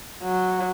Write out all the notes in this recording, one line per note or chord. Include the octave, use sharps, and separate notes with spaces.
F#3